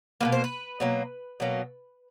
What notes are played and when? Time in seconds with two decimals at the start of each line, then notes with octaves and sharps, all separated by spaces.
0.21 B2 F#3 A#3 B4
0.32 C5
0.44 B4
0.80 B2 F#3 A#3
1.40 B2 F#3 A#3